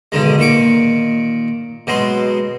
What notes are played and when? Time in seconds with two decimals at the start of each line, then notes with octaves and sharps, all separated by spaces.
0.12 B1 D3 D#3 G#3
0.38 A#2 D#3 C#6 D6
1.87 B2 F#3 G#3 C6